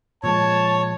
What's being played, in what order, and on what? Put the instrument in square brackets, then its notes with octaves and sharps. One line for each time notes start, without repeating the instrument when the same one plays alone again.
[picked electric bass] A#2 F3 G#3 [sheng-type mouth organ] C#5 [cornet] A5